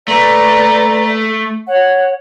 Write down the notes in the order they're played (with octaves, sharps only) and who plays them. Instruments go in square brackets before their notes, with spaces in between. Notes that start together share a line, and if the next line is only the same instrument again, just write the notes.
[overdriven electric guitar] A3 [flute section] B4 D5 A#5
[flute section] C#5 F#5